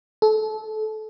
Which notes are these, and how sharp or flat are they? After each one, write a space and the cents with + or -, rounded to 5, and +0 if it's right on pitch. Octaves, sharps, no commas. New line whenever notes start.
A4 -25